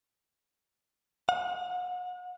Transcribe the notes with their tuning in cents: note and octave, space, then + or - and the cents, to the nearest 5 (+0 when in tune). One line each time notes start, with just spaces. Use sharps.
F#5 -40